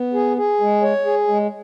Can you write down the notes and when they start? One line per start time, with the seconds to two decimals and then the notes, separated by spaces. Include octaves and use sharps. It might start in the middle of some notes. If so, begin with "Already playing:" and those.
Already playing: B3
0.14 G#4
0.37 G#4
0.61 G#3
0.83 C#5
1.05 G#4
1.28 G#3